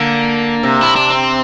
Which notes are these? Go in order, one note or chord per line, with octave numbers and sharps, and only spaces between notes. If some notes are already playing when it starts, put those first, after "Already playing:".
Already playing: D3 A#3
C3
E4
D4
C4